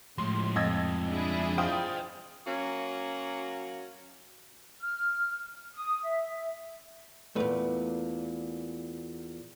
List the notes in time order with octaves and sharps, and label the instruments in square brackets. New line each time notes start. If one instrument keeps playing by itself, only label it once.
[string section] A2 [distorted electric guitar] F3 G#3 [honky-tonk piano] C6
[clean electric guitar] F2 [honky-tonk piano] D#5 E6 G#6
[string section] D4 E4 G#4
[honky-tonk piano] F4 G5 D#6 [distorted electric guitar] C5 D#5
[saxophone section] F#3 A#3 C#4 F#4
[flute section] F6
D#6
E5
[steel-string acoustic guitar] E2 A#2 [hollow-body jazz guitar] A3 B4